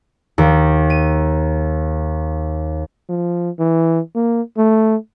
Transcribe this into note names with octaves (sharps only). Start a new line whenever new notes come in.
D#2
D#7
F3
E3
A#3
A3